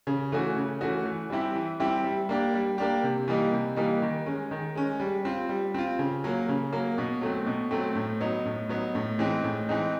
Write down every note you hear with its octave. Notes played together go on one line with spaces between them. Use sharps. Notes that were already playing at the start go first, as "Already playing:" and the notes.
C#3
E3 A3 C#4 F#4
C#3
E3 A3 C#4 F#4
E3
G3 C4 E4 G4
E3
G3 C4 E4 G4
G3
A#3 D4 G4
G3
A#3 D4 G4
C3
E3 G3 A#3 D#4
C3
E3 G3 A#3 D#4
D#3
G#3 C#4
D#3
G#3 C#4
G3
C4 F4
G3
C4 F4
C#3
F#3 A#3
C#3
F#3 A#3
B2
F#3 A3 C4
B2
F#3 A3 C4
A2
F#3 B3 D#4
A2
F#3 B3 D#4
A2
E3 G#3 C4 D#4
A2
E3 G#3 C4 D#4